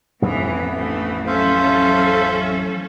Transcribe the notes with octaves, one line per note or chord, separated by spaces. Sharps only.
A1 F2 A2 E3 A#3 B3
D2 E3 A3
F#3 C#4 A4 C5 E5 F5